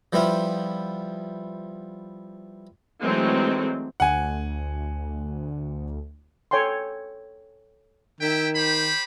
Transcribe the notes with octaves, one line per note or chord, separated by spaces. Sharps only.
F3 G3 B3 E4 F4
E3 F#3 G#3 A3 C4 D#4
D2 F#5 G#5
A4 C#5 G5 G#5 C6
D#3 E4 E5 G5
G4 C5 B5